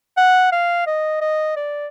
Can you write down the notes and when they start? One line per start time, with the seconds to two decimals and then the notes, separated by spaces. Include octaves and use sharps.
0.17 F#5
0.52 F5
0.87 D#5
1.21 D#5
1.56 D5